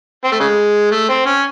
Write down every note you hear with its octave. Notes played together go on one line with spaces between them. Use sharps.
C4
A3
C#3 G#3
A3
C4
C#4